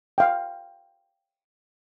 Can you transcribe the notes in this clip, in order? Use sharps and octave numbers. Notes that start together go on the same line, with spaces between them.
F5 G5